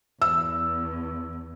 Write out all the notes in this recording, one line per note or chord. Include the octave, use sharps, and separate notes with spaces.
E2 E6